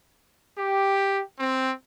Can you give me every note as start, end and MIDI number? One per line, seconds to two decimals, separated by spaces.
0.58 1.19 67
1.39 1.71 60